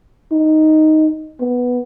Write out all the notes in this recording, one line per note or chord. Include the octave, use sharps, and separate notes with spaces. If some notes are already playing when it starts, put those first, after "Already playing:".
D#4
B3